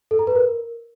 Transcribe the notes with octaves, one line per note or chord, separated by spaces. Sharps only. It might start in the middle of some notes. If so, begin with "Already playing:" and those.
A4
A#5
B4
A#4